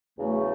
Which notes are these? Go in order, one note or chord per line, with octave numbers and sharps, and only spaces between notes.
E2 C#3 F#3 A3